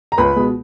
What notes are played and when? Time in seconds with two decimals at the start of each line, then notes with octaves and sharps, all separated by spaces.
0.12 A#5
0.18 C#2 B4 B5
0.36 B2 G#3